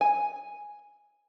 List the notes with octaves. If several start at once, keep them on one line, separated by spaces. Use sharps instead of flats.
G#5